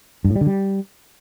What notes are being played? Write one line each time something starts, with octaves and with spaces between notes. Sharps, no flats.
G2
A2
G3
D3
G3